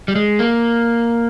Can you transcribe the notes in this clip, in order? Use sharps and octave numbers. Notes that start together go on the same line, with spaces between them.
G3
G#3
A#3